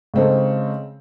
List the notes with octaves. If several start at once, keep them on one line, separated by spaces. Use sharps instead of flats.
C#3 G#3 C4 D#4 A4